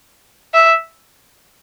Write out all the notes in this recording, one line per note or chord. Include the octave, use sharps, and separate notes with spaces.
E5